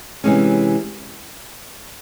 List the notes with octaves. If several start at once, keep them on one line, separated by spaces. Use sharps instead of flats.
C3 E3 G#3 C#4